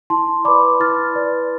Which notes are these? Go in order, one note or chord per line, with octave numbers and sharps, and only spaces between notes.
E4 A5 C6
B4 D5 B5 D6
E4 F6 A6
B4 D5